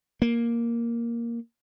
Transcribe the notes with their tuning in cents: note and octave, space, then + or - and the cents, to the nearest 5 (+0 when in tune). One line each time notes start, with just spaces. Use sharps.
A#3 +5